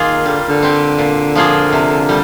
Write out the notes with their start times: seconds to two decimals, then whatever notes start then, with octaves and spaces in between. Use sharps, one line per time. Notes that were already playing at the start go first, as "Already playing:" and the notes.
Already playing: D#3 A#3 F4 G#4
0.26 D3 G3
0.49 D3
0.63 C4 G4
0.99 A#2
1.36 F3 A#3 F4 G#4
1.73 C3
2.09 G3